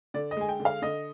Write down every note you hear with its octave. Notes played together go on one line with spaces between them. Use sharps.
D3 D5
D#5
G#3 G#5
G5
D3
F5
D3 D#5